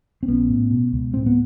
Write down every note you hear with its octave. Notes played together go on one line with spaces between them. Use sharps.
C4
A#1 B3 C#4
A2
B2
C#2
A2 C4
B3